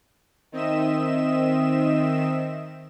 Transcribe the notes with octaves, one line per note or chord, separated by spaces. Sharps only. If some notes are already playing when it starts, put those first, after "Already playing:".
D#3 C4 D#5 E5 E7